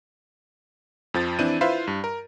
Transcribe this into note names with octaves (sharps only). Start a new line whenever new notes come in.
F2 F3 A6
E3 C4 D4 E4 G6 D#7
E4 F4 B4 C5 E5 F5
G2
A#4